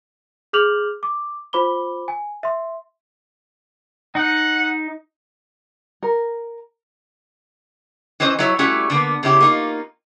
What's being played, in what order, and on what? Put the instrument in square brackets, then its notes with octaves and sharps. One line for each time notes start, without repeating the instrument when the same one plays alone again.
[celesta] G#4 D6 F6 G6 F7 F#7
D6
F4 C5 B5 D6 G7
G#5
E5 C6
[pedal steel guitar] D#4 [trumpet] F#5
[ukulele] A#4
[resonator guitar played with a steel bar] E3 C4 C#4 C5 D#5
F#3 G3 E4 C#5
G3 A3 C#4 E4 F#4 G4
D3 A#3 B3
C#3 C#4 E4 G4
A#3 D#4 F4